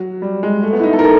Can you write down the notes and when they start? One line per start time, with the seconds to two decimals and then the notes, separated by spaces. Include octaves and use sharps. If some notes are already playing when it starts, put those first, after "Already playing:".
Already playing: F#3
0.22 G3
0.43 G#3
0.63 A3
0.73 B3
0.80 E4
0.83 D#4
0.93 A4
0.99 A#4
1.04 A4